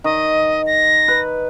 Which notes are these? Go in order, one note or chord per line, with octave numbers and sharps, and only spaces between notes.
D#3 D#5
A#6
B4